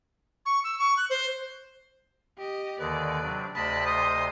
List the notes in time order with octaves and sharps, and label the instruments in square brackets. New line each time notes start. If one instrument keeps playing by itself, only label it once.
[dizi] C#6
E6
C#6
F#6
C5
[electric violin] G4 D#5
[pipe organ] D#2 D3 D#3 [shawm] B4 [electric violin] D5
[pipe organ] C3 F#3 D4
[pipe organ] D2 C3 D#5 [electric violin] D5 A5 [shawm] B5
[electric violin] C5 [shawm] D#6